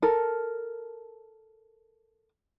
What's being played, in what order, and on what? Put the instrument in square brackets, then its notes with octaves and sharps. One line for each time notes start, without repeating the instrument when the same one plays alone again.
[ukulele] A4 A#4